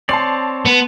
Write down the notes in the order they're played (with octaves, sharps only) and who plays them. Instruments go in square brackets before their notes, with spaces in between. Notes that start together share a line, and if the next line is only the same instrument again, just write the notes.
[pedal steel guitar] C4 C#5 D5 [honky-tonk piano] A5 C6 C7
[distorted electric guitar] B3